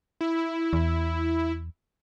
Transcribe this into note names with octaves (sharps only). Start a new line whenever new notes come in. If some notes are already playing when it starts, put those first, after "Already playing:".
E4
E2